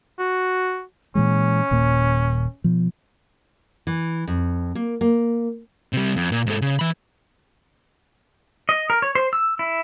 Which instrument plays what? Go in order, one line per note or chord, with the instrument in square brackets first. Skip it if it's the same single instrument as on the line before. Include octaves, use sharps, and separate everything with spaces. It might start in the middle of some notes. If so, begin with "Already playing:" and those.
[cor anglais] F#4
[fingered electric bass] A#2 E3 G#3 [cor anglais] C#4
[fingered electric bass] D#1 A#2 A#3
B2 F3
[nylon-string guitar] E3
F2
A#3
A#3
[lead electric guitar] C3 G3
F2
A#2
G#2 A4
C#3
E3 B5
[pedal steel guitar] D#5
A#4
C#5
C5
E6
E4